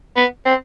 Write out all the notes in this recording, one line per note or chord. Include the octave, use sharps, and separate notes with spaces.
B3
C4